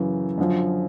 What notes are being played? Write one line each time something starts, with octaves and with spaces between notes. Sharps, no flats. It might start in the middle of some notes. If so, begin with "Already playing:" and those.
Already playing: F#2 C#3 E3
F#2 D3 F3